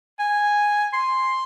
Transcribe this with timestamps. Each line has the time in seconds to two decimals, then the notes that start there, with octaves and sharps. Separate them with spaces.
0.19 G#5
0.93 C6